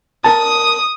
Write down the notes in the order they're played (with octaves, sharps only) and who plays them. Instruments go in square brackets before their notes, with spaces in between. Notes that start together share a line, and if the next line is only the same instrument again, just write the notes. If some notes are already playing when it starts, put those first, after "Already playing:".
[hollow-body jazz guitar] A#4 A5 [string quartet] D#6